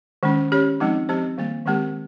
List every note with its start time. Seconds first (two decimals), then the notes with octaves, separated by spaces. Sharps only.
0.23 D#3 G#3 C#4
0.52 C#4 G4 C#5
0.80 F3 G#3 C4 D#4
1.09 F3 C4 G4 C5
1.38 D#3 G3 A#3
1.66 D#3 G#3 C4 G4 A#4